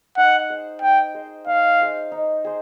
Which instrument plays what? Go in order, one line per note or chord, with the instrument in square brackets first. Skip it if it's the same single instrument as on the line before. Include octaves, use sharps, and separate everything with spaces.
[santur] D#4 [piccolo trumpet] F#5
[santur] G#4 C5 D#5
[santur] D#4 [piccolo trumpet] G5
[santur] G#4 C5 D#5
[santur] D#4 [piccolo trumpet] F5
[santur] G#4 C5 D#5
D#4
G#4 C5